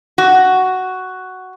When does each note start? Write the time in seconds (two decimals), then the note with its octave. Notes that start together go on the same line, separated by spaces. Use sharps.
0.18 F#4